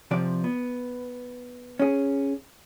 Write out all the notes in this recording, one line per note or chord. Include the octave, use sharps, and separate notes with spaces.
C3 F3 D5
B3
C#4 G#4